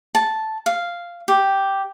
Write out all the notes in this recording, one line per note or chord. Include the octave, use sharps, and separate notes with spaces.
A5
F5
G4